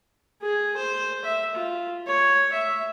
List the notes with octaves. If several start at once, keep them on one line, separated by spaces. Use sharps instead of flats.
G#4
C5
E5
F4
C#5
E5